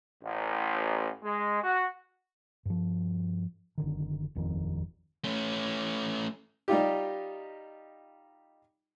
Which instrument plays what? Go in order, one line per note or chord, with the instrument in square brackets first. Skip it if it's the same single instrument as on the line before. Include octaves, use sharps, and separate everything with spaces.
[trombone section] A1
G#3
F#4
[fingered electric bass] G2 F3
F#1 D3 D#3
D#1 G#1 F2 D#3
[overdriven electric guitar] A3 C#4
[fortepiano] G3 D#4 F4 G4